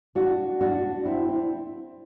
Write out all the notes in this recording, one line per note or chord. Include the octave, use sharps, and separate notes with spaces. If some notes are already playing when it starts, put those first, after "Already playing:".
D4 F#4
D4 F#4
C4 E4
C4 E4